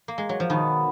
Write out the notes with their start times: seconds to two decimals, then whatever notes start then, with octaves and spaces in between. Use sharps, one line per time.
0.08 A#3
0.18 G#3
0.29 F#3
0.40 F3
0.49 B2 D#3 F#3 B3